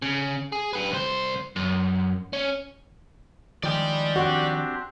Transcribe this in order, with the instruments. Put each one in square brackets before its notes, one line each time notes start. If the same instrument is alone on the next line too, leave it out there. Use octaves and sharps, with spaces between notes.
[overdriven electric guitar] C#3
G#4
G4 B4
C2 C5
F#2
C#4
[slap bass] D#3 F3 [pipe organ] G#3 [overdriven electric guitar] D5 G5
[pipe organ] C4 D4 G4 [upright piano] F#4